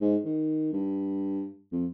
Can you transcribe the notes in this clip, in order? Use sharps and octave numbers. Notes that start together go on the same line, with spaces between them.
G#2
D#3
G2
F2